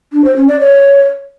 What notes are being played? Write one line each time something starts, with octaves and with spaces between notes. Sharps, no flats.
D4
C5
C#4
D5
C#5